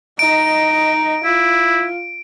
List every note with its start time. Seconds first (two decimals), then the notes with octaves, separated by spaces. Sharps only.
0.19 D#4 D#5 D7
1.24 E4 F4